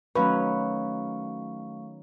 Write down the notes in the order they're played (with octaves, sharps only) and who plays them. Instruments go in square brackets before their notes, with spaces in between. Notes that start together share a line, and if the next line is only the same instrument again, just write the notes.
[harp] D#3 F#3 C#4 [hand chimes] A3 F5 C#6 [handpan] B4